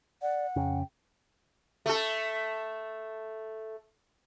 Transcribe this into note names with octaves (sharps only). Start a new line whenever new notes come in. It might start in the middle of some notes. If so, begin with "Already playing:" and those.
D5 F#5
F2 C#3 G5
A3 A4